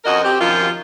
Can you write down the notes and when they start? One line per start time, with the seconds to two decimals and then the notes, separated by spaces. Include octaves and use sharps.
0.05 F2 C#4 F#4 A#4 D#5
0.23 C4 G4
0.40 F#2 C3 D#3 F3 D#4 F4